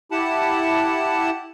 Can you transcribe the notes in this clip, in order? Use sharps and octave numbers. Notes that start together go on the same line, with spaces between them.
E4 G4 F#5 A5